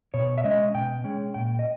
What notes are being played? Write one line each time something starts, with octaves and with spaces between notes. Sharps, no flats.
B2 C#5
E5
G#3 C#4 D#5
B2 G5
G#3 C#4
A#2 G5
D#5